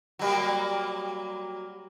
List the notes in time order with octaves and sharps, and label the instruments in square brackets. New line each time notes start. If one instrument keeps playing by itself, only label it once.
[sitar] F#3 G3 A#3